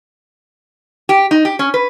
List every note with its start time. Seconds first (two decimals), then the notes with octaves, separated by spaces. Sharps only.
1.09 G4
1.31 D#4
1.45 G4
1.59 C#4
1.74 B4